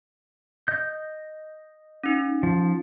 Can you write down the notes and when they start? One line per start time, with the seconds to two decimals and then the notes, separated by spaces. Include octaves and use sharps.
0.68 D#5 G6
2.04 C#4 D#4
2.43 F3